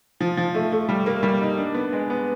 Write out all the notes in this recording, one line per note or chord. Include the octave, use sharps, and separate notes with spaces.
F3
F3
A3
A3
G3
A#3
G3
D#4
D4
B3
G#3
B3